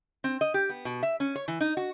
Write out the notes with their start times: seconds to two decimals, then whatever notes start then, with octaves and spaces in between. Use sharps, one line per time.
0.24 C4
0.41 D#5
0.54 G4
0.69 B3
0.85 B2
1.03 E5
1.20 C#4
1.36 C#5
1.48 E3
1.61 D#4
1.77 F#4